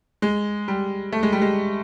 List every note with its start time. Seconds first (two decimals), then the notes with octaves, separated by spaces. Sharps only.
0.22 G#3
0.68 G3
1.12 A3
1.23 G#3
1.32 G3
1.42 G#3